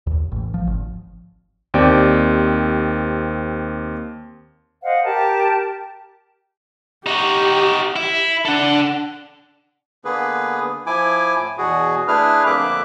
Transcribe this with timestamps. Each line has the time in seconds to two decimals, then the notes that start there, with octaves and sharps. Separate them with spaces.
0.07 D#2
0.32 A1
0.54 F3
0.67 G#1
1.74 D#2 C4 G4 D5 G5
4.82 C5 D#5 F5 F#5
5.04 G4 A#4 A5
7.06 D#4 F#4 G4
7.96 E4
8.45 D4 A4 F#5
10.05 D3 A#3 B3 G#4 B4
10.86 F3 E4 G#5 D6
11.37 A2
11.58 E2 B2 F#4 G#4
12.08 A3 D4 E4 G#4 B4 F6
12.46 F2 D3 A#3 E5 D6 F#6